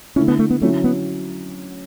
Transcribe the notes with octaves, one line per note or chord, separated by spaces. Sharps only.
D3 A3 C#4 E4
B3
A3
B3
D3 F#3 A3 C#4 E4
B3